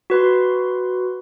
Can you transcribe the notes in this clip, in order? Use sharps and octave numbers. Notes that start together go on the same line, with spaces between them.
F#4 B4 C6